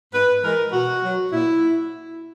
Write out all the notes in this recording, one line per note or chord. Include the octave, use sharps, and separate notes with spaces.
G#2 B4
E3 G#3 A#4
B2 F#4
F#3
A#2 E4